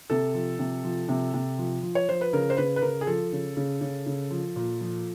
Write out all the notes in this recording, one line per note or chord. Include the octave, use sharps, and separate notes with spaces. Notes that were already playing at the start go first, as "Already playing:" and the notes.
C3 A4
F3
C3
F3
C3
C3
F3
F3
C#5
F3 C5
B4
C#3 A#4
C5
C#3 B4
B4
C#3 A#4
G#4
F3 A4
C#3
C#3
C#3
C#3
F3
A#2
F3